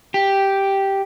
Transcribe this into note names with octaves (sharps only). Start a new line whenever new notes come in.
G4